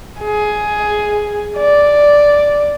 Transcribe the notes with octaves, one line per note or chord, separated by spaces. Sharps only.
G#4
D5